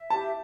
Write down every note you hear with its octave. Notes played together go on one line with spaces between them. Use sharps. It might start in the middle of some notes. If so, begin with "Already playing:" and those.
Already playing: E5
G4 A5